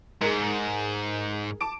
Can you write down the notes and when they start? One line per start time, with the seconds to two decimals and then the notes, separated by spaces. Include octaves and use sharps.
0.21 G#2 G#4 A#4
1.61 A5 D6 D7